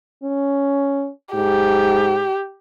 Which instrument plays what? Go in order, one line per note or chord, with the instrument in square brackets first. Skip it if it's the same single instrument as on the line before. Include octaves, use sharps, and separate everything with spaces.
[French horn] C#4
[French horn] G#2 [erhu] G4